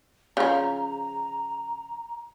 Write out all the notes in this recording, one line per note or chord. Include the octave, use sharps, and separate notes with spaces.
C#3 F3 A#5